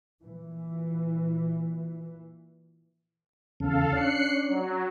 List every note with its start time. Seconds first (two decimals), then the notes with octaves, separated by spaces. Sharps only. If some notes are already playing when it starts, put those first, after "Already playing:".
0.23 A#2 E3
3.60 E2 C#3 A4 F5
3.93 C#4 D4 F#6 C7 C#7
4.48 F#3